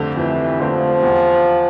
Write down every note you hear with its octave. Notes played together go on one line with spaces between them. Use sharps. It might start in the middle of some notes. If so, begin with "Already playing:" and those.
Already playing: F2 D3 A3 C4 G4
F2 E3
D3 F3 A3 C4 G4
E2